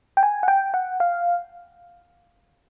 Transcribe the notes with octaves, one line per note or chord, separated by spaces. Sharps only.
G5
G#5
F#5
G5
F#5
F5